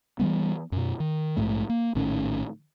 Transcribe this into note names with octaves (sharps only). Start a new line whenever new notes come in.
E3 F3 G3 B3
F#2 B2
D#3
A#1 F2 G#2 A3
A#3
A#1 A2 D#3 C#4